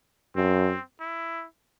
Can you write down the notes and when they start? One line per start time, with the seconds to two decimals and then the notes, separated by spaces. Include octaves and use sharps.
0.36 F#2 C4
1.00 E4